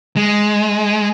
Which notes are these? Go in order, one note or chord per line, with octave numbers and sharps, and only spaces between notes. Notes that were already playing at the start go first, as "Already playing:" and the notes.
G#3